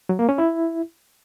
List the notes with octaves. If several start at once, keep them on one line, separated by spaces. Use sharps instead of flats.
F#3
A#3
C#4
E4